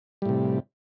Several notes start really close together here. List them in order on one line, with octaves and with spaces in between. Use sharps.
G3 A2 C3